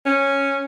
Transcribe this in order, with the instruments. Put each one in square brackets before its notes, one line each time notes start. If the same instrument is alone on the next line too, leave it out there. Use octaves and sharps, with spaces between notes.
[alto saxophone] C#4